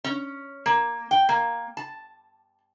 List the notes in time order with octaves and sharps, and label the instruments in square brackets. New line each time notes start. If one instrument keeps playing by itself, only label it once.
[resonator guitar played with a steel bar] C#4
A#3
G5
A#3
A5